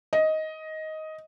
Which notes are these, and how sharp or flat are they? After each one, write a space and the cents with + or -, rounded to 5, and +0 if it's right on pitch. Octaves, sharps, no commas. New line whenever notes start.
D#5 +10